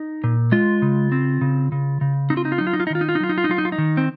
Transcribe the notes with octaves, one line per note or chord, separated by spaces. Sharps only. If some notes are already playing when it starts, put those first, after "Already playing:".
Already playing: D#4
A#2
G#3 F4
C#3
C4
C#3
C#3
C#3
C4 D#4
F4
D#4
F4
F#3 D#4
F4
D#4
F4
D#4
D#3 F4
D#4
F4
D#4
F#3 F4
D#4
F4
D#4
F#3 F4
D#4
F4
D#4
D#3
C4